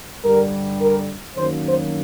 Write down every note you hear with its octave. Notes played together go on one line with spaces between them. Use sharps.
G2 D3 G3 A#4
A#4
F#2 D#3 F#3 A#3 C5
C5